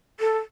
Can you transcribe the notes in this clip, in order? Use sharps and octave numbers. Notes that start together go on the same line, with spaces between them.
A4